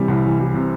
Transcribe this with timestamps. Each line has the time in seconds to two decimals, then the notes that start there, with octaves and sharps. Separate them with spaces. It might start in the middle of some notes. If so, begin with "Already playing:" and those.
Already playing: C3 E3 G3
0.08 C2
0.25 E3
0.40 G3
0.54 C3